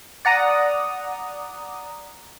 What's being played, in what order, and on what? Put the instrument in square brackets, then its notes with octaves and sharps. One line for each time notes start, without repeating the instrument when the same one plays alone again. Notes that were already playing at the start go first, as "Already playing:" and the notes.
[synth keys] D5 F#5 A#5 D#6